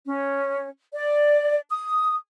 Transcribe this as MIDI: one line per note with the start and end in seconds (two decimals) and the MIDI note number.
0.05 0.68 61
0.93 1.59 74
1.68 2.14 87